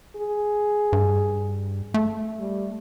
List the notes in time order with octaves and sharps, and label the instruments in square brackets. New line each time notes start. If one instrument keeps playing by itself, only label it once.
[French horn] G#4
[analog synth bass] G2
A3
[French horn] G3